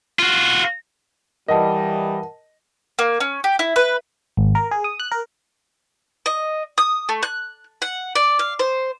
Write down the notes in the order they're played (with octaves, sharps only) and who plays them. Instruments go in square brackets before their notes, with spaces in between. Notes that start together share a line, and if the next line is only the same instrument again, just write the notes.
[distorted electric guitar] F4 F#4
[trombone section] E3 G3 [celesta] A#4 F#5 A5 [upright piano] D#5
[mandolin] A#3
C#4
G4
E4
B4
[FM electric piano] G#1
A#4
G#4
D#6
F#6
A#4
[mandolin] D#5
D#6
A3
F#6
F#5
D5
F5
C5